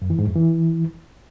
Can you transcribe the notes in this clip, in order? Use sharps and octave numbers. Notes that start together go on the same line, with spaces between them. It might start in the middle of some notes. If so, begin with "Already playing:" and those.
F#2
E3
G#2
F2
E3